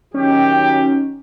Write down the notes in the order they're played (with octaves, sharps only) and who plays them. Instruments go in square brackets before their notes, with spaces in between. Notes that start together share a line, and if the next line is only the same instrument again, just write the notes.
[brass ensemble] D#3 F#3 [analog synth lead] C#4 [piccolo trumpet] G4